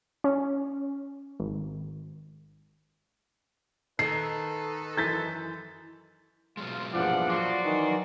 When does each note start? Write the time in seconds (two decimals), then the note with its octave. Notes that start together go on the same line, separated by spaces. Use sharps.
0.24 C#4
1.40 G#1
3.99 D#3 D#4 A4 B4 C7
4.97 F#2 E3 G6 A6 B6
6.57 B2 F#3 G#3 F4
6.93 E2 G2 A#2 F3 D5 F#5
7.30 F#3 F#4 D5 C6
7.64 D#3 E3 D#4